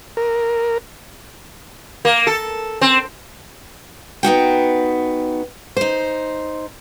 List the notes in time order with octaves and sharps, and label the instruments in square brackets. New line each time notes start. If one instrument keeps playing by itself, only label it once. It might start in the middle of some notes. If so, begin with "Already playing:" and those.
[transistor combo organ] A#4
[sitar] A#3
A4
C4
[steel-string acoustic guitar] B3 D#4 F#4 G5
D#4 C5